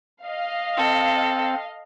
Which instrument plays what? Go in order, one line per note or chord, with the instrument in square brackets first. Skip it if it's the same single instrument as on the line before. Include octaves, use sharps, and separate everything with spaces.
[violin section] D#5 F5
[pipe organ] C4 [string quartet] A4